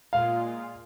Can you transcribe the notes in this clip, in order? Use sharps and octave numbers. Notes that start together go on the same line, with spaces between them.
A#2 G#3 F4 F5